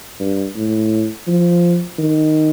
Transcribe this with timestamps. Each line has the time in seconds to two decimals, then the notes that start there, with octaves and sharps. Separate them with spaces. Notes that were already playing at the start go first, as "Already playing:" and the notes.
0.20 G2
0.56 A2
1.27 F3
1.98 D#3